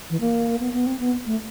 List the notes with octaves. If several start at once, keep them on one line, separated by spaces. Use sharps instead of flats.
E3
A#3
B3
B3
C4
B3
A3